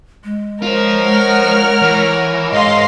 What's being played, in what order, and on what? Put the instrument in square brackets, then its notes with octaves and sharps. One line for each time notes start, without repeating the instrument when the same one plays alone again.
[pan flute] G#3
[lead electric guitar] F4 C5 [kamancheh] A#4 C#5
[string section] F#5 F6
[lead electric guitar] E3
[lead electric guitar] G#2 [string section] D#5 F5 C6